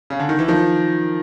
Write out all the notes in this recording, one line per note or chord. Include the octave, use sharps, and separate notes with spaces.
C#3
D3
D#3
E3
D#3 F3